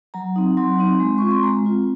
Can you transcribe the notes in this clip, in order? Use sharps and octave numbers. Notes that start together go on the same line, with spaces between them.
F#3 A#5
C4 D#4
F#3 C6
C4 D#4
G#3
C4 F4 C#6
C6
G#3 A#5
C4 F4